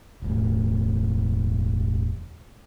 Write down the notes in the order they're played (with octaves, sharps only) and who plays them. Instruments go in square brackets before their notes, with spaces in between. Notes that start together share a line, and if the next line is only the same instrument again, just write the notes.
[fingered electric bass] E1 A2